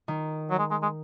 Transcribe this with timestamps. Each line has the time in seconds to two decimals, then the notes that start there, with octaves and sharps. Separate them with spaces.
0.08 D#3
0.50 F#3
0.59 G#3
0.71 G#3
0.82 G#3